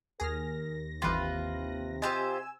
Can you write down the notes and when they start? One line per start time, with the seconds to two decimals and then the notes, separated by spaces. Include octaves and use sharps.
0.20 D#2 G#4 A#4 F6 A#6
1.02 G1 C3 E3 F4 G4 B4
2.02 F4 G4 C5 D#5 G#5 E6